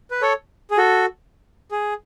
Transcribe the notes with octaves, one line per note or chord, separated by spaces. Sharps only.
B4
A4 C#5
G#4
F#4 A4
G#4